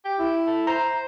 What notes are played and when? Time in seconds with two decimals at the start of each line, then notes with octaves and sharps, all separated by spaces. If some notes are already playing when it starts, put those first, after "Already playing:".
0.05 G4
0.19 E4
0.47 A3
0.67 C5 A#5